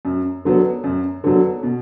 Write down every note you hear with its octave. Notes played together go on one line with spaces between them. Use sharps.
F#2
D3 F#3 B3
F#2
D3 F#3 B3
B2